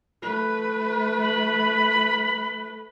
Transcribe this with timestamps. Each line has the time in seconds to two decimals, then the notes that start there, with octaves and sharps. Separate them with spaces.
0.22 A3 B4
1.21 B5